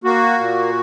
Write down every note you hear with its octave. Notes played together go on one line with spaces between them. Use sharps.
A#3 F#4
A#2